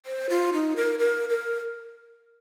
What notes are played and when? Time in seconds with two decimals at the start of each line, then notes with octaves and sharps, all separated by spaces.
0.06 C5
0.30 F4
0.53 D#4
0.76 A#4
0.99 A#4
1.29 A#4